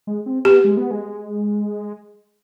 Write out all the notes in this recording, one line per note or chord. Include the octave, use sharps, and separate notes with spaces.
G#3
C4
B3 G4
G#3
B3
G#3